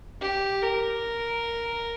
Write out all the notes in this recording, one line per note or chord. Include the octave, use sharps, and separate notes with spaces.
G4
A#4